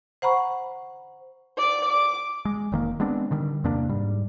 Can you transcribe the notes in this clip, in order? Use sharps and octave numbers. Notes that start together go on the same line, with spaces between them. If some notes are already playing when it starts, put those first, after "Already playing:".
C5 F#5 A#5 B5 C#6
D5 D6
D6
G#3
F1 D#3 A#3
G#3 B3 C4 D4
D3 D#3 G3
E2 C3 A#3 D4
G#2 G3